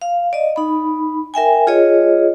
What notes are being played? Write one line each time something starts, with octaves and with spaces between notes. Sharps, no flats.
F5
D5 D#5
D#4 B5
A#4 E5 G5 G#5
F4 G#4 C#5 D#5